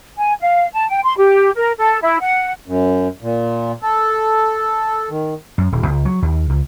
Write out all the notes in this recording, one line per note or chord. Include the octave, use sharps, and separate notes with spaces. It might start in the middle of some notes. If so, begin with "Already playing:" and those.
G#5
F5
A5
G5
C6
G4
A#4
A4
E4
F#5
F#2
A#2
A4
D#3
F#2
D#1
C#2
F#3
D#2
C#2